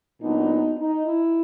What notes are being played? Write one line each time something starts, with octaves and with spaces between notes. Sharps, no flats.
A#2 F#3 B3 D4 D#4
D#4
E4